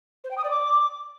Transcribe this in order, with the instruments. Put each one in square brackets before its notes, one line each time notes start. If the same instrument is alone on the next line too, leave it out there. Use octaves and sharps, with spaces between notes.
[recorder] C5
G5
D#6
D5
D6